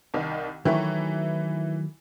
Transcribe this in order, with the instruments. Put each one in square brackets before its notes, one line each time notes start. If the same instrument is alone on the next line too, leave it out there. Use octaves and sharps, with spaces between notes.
[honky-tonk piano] C2 D#3
[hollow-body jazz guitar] D#3 F#3 A3 [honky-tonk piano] E3 E4